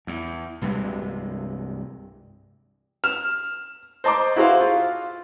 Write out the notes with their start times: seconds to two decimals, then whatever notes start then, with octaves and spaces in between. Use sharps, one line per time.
0.07 E2
0.61 C2 G2 C3 G#3
3.04 F6 E7
4.04 C5 D#5 A5 A#5 D6
4.36 E4 F#4 G#4 C5 F5
4.61 F4